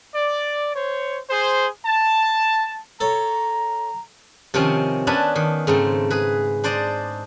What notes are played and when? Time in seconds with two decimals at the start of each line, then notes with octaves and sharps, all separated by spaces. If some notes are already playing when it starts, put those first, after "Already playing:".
0.15 D5
0.74 C5 C#5
1.29 G#4 C5
1.85 A5
3.00 A4 C#5 A#5
4.54 C3 D#3 F3 C4 C#4
5.07 B3 C#4 D4 B4 G#5 A5
5.35 D#3
5.67 G#2 C#3 A3 C4
6.10 G#4 B4
6.64 D4 C5 D5 D#5